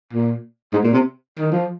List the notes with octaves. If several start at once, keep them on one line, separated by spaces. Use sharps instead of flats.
A#2
G#2
A#2
C3
D#3
F3